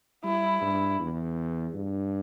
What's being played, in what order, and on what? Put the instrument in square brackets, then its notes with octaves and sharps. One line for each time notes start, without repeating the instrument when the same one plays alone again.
[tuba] G3 [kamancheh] E4
[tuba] G2
E2
G2